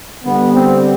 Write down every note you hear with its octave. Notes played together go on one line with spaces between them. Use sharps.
D3 G3 B3
C4